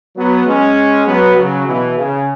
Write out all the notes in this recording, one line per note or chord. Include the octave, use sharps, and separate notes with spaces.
F#3 B3
G#3 C#4
F#3 B3
C#3 F#3
B2 E3
C#3